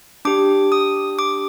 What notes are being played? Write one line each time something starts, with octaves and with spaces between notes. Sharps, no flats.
D4 G4 D6
D#6
D6